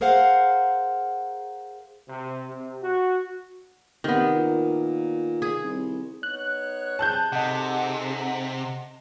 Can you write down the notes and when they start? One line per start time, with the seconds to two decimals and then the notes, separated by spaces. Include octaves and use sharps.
0.01 G#4 A#4 C5 F5 F#5
2.08 C3
2.48 C3
2.82 F#4
4.04 C3 D#3 B3
4.35 A#2
5.42 G#4
5.64 C2
6.23 B3 D#4 C#5 F#6
6.99 G3 C4 G#4 A5 F#6 G6
7.32 C3 D#4 G#4 A4 D#5 F#5